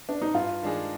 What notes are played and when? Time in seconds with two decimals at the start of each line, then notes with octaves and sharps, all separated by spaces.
0.09 D4
0.22 D#4
0.34 G2 F4
0.63 D#3 G#3 D4 G#4